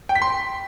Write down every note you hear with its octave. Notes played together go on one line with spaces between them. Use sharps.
G5
B6
C6